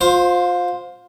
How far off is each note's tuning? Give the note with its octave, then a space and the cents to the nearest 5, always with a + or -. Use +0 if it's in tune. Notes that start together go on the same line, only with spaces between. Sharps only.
F4 +25 C5 +0